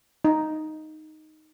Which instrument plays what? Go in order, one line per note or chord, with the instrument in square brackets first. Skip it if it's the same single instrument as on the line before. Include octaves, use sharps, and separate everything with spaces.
[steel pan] D#4